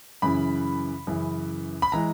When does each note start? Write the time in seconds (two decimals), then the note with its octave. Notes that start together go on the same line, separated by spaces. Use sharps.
0.22 F#2 C#3 E3 B5
1.07 F#2 C#3 E3
1.82 B5
1.92 E3 G#3 A#5